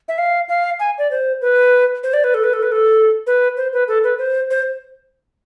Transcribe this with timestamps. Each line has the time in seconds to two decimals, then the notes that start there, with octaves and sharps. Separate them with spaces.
0.08 E5
0.18 F5
0.49 F5
0.80 G#5
0.98 D5
1.11 C5
1.42 B4
2.03 C5
2.14 D5
2.24 B4
2.34 A4
2.44 B4
2.53 A4
2.63 B4
2.72 A4
3.27 B4
3.57 C5
3.73 B4
3.88 A4
4.04 B4
4.19 C5
4.50 C5